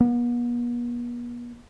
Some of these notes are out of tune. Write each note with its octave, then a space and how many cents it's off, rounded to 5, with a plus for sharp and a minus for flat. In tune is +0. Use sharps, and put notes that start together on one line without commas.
B3 -45